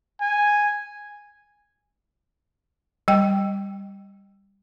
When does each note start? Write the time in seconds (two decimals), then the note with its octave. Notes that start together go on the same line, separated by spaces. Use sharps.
0.21 G#5
3.08 G3 G5